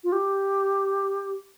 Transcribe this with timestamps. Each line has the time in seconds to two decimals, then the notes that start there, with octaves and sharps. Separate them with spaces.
0.04 F4
0.12 G4